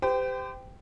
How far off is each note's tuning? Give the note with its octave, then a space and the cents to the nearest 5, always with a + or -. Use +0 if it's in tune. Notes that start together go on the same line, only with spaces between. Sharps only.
G4 +15 C5 -40 G5 +0